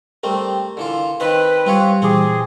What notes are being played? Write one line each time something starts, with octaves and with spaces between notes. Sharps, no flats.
G3 A3 C4 A#4
D3 E3 F4
D#3 C4 B4
G3 C4 F4 C#5
A#2 E3 C4 G#4 D6